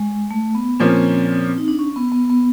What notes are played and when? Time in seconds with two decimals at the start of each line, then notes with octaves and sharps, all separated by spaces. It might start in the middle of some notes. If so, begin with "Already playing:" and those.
Already playing: G#3
0.31 A3
0.55 B3
0.79 A#2 F3 A#3 C4 C#4
1.58 D#4
1.68 D4
1.79 C#4
1.96 B3
2.12 B3
2.30 B3